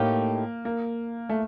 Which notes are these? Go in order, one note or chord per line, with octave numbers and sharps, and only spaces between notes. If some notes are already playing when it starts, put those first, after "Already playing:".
Already playing: A2 A3 A#3 D#4 G4
A#3
A3